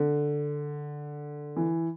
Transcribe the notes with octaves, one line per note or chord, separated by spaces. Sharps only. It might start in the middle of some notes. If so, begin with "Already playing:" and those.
Already playing: D3
E3